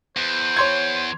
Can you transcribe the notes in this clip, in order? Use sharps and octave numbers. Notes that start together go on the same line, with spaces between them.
E2 C5
C#5 C6 G#6